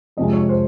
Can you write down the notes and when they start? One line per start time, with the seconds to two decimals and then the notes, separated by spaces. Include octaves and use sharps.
0.17 F2 C3 F3 G#3 D#5
0.33 C#5
0.49 C5